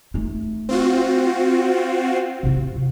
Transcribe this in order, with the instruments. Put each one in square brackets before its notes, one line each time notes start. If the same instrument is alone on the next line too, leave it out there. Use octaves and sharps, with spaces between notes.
[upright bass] A3 D#4
[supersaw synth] C4 F4 F#4
[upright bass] C3 E4